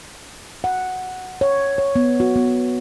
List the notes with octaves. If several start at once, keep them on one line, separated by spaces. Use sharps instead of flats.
F#5
C#5
C#5
B3
F#4
B3